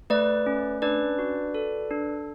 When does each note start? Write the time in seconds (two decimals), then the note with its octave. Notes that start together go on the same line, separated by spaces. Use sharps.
0.10 A3 B4 D5
0.46 C#4
0.82 D4 B4 D5
1.19 F#4
1.55 A4
1.91 D4